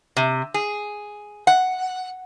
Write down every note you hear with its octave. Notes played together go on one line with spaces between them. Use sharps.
C3
G#4
F#5